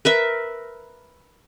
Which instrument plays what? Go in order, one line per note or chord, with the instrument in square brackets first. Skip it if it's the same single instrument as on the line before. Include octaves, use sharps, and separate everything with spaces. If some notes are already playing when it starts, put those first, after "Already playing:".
[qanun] A#4 B4 E5